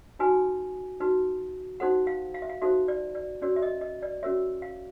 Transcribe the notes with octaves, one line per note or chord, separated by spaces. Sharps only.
D#4 F#4 B4 G#5
D#4 F#4 B4
D#4 F#4 A4 C5 F#5
F5
F5
E5
F5
D#4 F#4 A4 C5 E5
D5
D5
C#4 F#4 A#4 C#5 D5
E5
D#5
D#5
D5
C#4 F#4 A#4 C#5 E5
F5